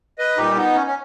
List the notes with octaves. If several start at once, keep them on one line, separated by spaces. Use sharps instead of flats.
B4 D#5
A#2 G3 D#4 G4
B3 D#4
C#4
C#4